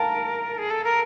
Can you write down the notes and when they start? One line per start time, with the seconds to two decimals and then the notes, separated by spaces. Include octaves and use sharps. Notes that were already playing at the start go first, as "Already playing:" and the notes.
Already playing: A#4 F5 G5 A5
0.58 G#4
0.70 A4
0.84 A#4